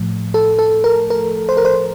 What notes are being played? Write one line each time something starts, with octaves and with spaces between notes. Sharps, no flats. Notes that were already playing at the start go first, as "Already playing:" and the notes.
Already playing: A2 F3 A3
A4
A4
A#4
A#4
C5
A#4
C5